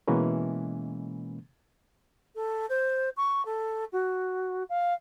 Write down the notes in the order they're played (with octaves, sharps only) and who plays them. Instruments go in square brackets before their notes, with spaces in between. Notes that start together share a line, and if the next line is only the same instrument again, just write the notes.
[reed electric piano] B2 E3 G#3 A#3 C#4
[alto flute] A4
C5
C#6
A4
F#4
F5